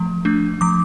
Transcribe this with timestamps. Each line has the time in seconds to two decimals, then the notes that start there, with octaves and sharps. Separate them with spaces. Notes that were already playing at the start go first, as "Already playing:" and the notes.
Already playing: F3 A3
0.25 A3 D4
0.61 F3 D6